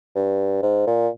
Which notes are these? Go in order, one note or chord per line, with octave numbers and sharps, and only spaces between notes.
G2
G#2
A#2